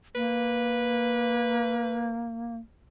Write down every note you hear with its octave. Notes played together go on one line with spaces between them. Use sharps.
A#3 B4